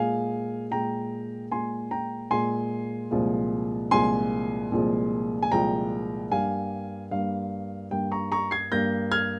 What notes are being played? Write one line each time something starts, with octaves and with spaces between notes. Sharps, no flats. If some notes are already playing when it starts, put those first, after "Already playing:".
Already playing: A#2 G#3 F5 G#5
A#2 G#3 G5 A#5
A#2 G#3 G#5 C6
G5 A#5
A#2 G#3 G#5 C6
C2 A#2 F3 G#3
C2 A#2 F3 G#3 G#5 C6
C2 A#2 F3 G#3
G#5
C2 A#2 F3 G#3 G5 A#5
G2 G3 A#3 F5 G#5
G2 G3 A#3 F5
G2 G3 A#3 G5
A#5 C#6
A#5 C#6
G#6 C7
G2 G3 A#3 G6 A#6
F6 G#6